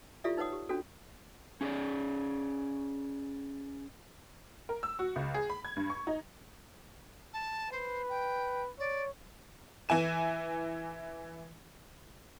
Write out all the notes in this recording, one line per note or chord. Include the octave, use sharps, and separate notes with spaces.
E4 F4 G4 A4 D5 E5
D#4 B4 C#5 F#5 D#6
G4
C#4 D4 F#4 A4
C#4 G#4 A4 C#5 D5
A#4
E6
F#4
C#2
G#4
B5
G#6
G2
C#6
D#4
A5
B4 C5
G5
C#5 D5
E3 E4 G#5 E7